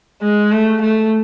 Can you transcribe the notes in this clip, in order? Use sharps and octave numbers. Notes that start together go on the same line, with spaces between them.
G#3
A3
A3